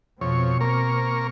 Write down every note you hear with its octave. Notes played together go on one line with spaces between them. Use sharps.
F2 B2 C4 C#5
A#3 A#4 C#6